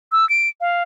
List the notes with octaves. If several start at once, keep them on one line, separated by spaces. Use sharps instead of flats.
E6
D7
F5